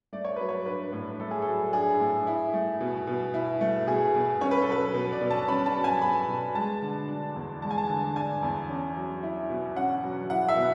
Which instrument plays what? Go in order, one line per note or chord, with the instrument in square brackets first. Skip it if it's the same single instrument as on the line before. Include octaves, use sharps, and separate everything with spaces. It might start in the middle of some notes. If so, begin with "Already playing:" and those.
[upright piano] A3 D5
C#5
F#3 B4
C#5
D4 B4
A2
A3 A4
G#4
F#3 A4
D4 G#4
A2
E4
A3
B2
B2
E4
A3
B2 G#4
B2
C#4 C#5
B4
A4
F#3 B4
B2
D5
B2
A5
C#4 B5
A5
F#3
G#5
B2 B5
B2
G#3 A5
D3
D4
E2
G#3 A5
G#5
A5
D3
D4 G#5
E2
C#4
F#3
E4
B2
C#4 F#5
F#3
E4 F#5
E5
B2